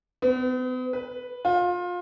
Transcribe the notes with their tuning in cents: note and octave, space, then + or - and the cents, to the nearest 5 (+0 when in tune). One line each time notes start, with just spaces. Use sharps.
B3 +45
B4 +0
F4 +25